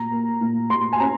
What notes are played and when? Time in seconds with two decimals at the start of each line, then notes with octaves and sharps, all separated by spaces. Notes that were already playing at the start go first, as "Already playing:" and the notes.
Already playing: A#2 A#5
0.11 A#3
0.41 A#2
0.70 A#2 C6
0.93 G#5
1.00 C#4 A#5